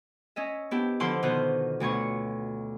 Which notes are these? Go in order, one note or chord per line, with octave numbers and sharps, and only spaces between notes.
C#4 D#5 E5
B3 D4 E4 G4
D3 F3 E4 F#5 C6 D6
B2 D3 D#3 F4 C5 F#6
D2 B2 C#5 C#6